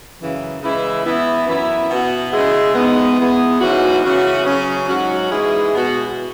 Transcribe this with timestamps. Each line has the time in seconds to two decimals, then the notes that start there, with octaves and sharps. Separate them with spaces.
0.19 F#2 C#3 E3
0.62 C#3 E3 G#3 E4
1.04 E3 B3 E4
1.47 F#2 E3 B3 E4
1.90 B2 B3 F#4
2.32 C#3 G#3 E4 G#4
2.75 G#2 G#3 B3
3.18 E2 E3 B3 G#4
3.60 G#2 E3 C#4 F#4
4.03 C#3 E3 C#4 F#4
4.45 C#3 F#3 C#4
4.88 G#2 F#3 C#4 F#4
5.32 G#2 E3 G#3 E4 G#4
5.74 B2 B3 F#4